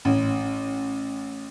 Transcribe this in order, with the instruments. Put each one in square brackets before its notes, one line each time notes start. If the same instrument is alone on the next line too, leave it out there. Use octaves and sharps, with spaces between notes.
[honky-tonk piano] A1